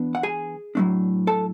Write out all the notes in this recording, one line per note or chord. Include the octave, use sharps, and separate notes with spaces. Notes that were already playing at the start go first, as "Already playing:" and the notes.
Already playing: E3 B3 D4
F#5
G#4 G#5
A2 F#3 A3 D4
A4 A5